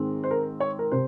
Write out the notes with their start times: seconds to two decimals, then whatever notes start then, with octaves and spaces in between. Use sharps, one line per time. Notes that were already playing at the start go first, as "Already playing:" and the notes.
Already playing: G#2 D#3 G#3 C4
0.24 C5
0.31 A#4
0.60 C#5
0.79 A#4
0.92 C3 C5